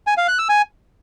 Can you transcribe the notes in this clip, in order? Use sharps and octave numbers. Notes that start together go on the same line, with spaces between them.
G#5
F5
F#6
E6
G#5